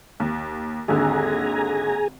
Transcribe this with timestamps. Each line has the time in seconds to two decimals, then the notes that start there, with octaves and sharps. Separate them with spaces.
0.20 D#2
0.88 G#1 D#2 D3 G#4 G#5 A#5